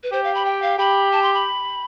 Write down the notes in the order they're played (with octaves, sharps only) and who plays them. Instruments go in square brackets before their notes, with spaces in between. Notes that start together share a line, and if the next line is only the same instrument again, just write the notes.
[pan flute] B4
[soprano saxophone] G4 [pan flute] C5
[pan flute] F5
B5
G5
F5
[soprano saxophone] G4 [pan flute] B5
[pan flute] A5
C6
B5